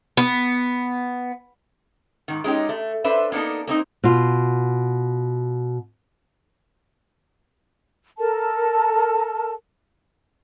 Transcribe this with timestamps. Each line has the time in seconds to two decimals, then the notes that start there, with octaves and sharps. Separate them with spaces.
0.17 B3
2.28 G#2 D#3
2.44 G#3 C#4 D#4 G4
2.69 A3
3.04 D4 A4 B4 C5 E5
3.32 A#3 B3 D4 D#4 A4
3.67 A#3 C4 D#4
4.04 B2 F4
8.18 A4 A#4 A5